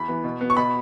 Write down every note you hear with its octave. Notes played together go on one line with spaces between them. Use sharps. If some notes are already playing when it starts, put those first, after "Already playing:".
Already playing: E2 B5
E3 B3
B2
B3
C#6
B2 B5